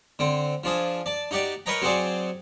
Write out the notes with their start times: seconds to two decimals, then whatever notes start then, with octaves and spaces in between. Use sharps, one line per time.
0.19 D3 C4
0.64 F3 D4 G#4
1.06 D5 A5
1.31 D#4 F#4 G4 D5
1.66 A#4 B4 C#5 D#5 G5 A#5
1.82 F#3 C4 F#4 G#4 C5 D5